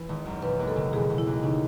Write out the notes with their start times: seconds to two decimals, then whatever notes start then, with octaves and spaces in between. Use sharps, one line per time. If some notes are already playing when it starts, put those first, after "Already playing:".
Already playing: E3
0.09 G#1
0.25 F#2
0.42 E1 B4
0.59 D#2
0.68 A4
0.76 C#3
0.93 E1 G#4
1.10 E1
1.18 E4
1.27 D#2
1.43 C#3 D#4